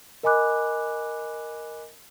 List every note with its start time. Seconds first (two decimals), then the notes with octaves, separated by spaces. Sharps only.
0.23 A#4 D#5 G#5 B5 D6 F#6